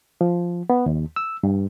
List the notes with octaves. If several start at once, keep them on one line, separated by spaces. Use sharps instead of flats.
F3
B3
D#2
E6
G2